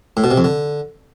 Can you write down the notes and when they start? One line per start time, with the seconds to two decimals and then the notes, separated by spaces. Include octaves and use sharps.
0.17 A2
0.24 B2
0.31 C3
0.38 F2
0.44 D3